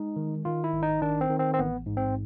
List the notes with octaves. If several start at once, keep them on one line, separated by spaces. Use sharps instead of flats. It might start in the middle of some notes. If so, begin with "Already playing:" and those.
Already playing: G#3 D#4
D#3
D#3 F4
E4
G#1
D#4
D#3 D4
C4
D#3
C4
C4
A1 B3
G#2
C4